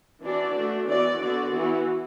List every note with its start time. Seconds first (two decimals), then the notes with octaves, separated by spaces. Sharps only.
0.23 E3 D4 F#4 D5
0.55 A3 D4 F#4
0.87 E3 B3 F#4 D5
1.20 D3 B3 F#4 D5
1.53 E3 B3 F#4